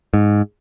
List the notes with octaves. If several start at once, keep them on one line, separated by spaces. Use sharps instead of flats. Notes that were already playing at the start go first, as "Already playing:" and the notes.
G#2